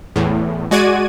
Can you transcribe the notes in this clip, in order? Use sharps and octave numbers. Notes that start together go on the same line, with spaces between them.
E2 A2
G#3 F#4 D5 G#6 D#7